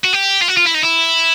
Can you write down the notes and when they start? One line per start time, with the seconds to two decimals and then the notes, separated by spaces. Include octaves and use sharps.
0.04 F#4
0.13 G4
0.42 F4
0.48 F#4
0.57 F4
0.65 E4
0.74 D#4
0.82 E4